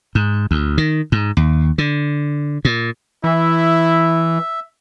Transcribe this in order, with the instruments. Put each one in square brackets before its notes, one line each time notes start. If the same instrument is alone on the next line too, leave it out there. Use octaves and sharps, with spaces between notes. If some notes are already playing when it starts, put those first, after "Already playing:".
[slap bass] G#2
D2
D#3
G#2
D#2
D3
A#2
[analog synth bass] E3 [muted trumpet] E4 [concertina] E5